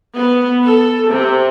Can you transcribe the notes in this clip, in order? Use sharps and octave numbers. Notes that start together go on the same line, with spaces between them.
B3
A4
C3